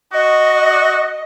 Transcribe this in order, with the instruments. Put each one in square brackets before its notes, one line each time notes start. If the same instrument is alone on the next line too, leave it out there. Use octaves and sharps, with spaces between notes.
[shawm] F#4 [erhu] D#5